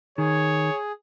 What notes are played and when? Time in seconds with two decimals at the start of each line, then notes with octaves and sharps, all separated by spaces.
0.18 D#3 G#4 C#5